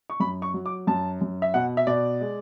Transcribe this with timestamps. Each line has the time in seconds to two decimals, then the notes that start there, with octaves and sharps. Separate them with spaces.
0.10 C#6
0.20 F#2 B5
0.42 C#6
0.54 F#3
0.66 D6
0.87 F#2 A5
1.21 F#2
1.42 E5
1.54 B2 F#5
1.77 E5
1.87 B2 D5
2.21 G#3